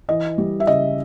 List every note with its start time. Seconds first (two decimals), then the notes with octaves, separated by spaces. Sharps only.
0.08 E3 D#5
0.38 G3
0.60 E5
0.67 C#3 D#5